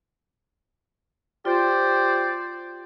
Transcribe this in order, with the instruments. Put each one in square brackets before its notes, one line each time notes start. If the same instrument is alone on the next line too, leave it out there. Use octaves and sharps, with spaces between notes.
[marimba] F4 [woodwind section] G4 C5 D5